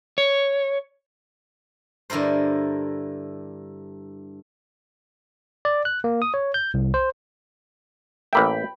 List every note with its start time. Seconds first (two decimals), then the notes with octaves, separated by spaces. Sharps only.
0.18 C#5
2.10 G2 D3 E4 A#4 C5
5.65 D5
5.85 F#6
6.04 A#3
6.22 D#6
6.34 C#5
6.54 G6
6.74 C2
6.94 C5
8.33 A1 A#3 E5 G5 B5